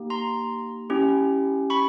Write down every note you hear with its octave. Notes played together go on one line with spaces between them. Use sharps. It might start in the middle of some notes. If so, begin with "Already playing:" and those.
Already playing: A#3 D#4 G4
A#5 C6
C#4 E4 G4
B5 C#6